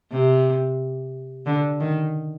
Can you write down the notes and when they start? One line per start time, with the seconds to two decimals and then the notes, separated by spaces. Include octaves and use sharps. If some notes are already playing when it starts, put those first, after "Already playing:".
0.11 C3
1.46 D3
1.80 D#3